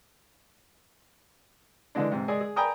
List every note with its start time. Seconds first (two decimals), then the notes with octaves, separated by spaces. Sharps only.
1.95 D3 E3 G#3 D4
2.11 G#2 C3
2.28 G#3 G#4 D5 G#5
2.41 G#4
2.56 D5 G5 G#5 A#5 B5 D#6